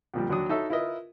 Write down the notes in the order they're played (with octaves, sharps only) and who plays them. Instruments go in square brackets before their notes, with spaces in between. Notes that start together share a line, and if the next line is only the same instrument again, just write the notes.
[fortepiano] F2 A#2 G3
D#2 F#3 D4 F#4 C#6 D#6
D#4 E4 F#4 A4 C#5 E5
E4 F4 A#4 B4 D#5 E5